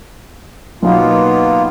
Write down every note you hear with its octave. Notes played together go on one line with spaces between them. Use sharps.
B1 A#3 B3 D#4 F4